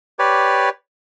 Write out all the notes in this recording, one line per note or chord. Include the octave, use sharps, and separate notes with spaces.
G4 B4 C#5 D5